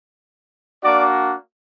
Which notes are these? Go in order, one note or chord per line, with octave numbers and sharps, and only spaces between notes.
A#3 D4 F#4 D5 D6